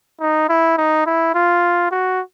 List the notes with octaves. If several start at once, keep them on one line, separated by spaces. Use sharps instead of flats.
D#4
E4
D#4
E4
F4
F#4